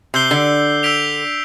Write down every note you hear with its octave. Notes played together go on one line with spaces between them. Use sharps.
C3 E6 G6 C7 G7
D3
E6 G6 B6 D7 F7